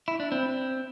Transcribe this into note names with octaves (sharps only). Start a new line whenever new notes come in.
E4
D4
C4